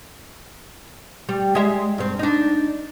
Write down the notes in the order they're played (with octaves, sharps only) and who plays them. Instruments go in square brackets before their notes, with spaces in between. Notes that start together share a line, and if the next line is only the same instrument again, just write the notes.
[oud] G3
G#3 E5
G2 C4
D4 D#4